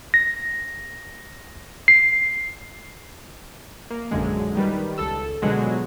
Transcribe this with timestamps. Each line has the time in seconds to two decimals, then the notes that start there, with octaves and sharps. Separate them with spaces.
0.14 A#6
1.88 C7
3.90 A#3
4.11 A#1 F#2 D3 G#3
4.56 D#3 G3 B4
4.98 C#2 A4 E6
5.42 B2 D3 F3 F#3 G#3 F#4